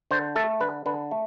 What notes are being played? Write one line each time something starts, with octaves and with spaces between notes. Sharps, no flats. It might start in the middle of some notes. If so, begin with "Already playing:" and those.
D3 C5
A3 A4
D3 B4
D3 B4
A3